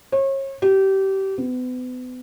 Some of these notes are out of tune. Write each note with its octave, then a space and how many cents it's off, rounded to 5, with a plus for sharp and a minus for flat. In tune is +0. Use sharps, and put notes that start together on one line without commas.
C#5 -35
G4 -25
B3 +35